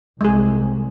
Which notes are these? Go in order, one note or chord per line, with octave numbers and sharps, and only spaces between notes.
C2 G#3 G#4